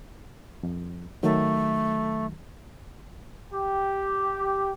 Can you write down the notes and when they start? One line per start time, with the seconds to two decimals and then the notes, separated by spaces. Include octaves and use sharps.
0.63 F2
1.23 D#3 F#3 A3
3.53 G4